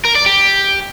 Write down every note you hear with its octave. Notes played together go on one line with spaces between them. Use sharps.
A#4
D5
G4